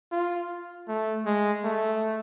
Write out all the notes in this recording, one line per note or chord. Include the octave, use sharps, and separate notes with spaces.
F4
A3
G#3
A3